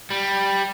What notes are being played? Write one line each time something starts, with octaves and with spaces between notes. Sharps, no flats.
G3